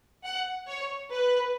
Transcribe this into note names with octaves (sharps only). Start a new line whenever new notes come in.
F#5
C#5
B4